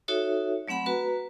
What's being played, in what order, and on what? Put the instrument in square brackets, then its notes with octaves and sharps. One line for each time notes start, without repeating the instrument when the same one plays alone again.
[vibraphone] D#4 F#4 A4 C#5 E5
F#3 A3 C4 F#5 B5
F#4 B4 A#5